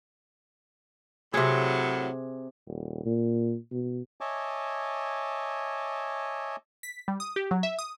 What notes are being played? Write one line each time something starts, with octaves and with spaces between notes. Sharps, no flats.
A2 C3 F#3 G#4
D#1
A#2
B2
C#5 D#5 E5 G#5 A5 D6
B6
G3
D#6
G4
F#3
E5
D#6